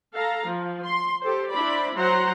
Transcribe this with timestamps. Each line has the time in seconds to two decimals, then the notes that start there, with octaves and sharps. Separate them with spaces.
0.14 A4 F5 A#5
0.46 F3
0.86 C6
1.22 G4 A4 C5
1.51 D4 E4 C5 D5 B5
1.96 F#3 C5 F#5 A#5